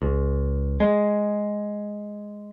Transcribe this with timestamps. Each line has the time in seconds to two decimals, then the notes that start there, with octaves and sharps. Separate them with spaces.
0.02 C#2
0.80 G#3